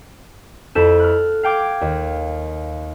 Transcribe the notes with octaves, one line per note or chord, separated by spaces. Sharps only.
F2 E4 A4 G6 E7
F6 F#6
F5 G5 D6 G#6
D#2